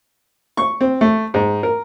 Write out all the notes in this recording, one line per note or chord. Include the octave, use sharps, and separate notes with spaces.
C#6
C4
A3
G#2
A#4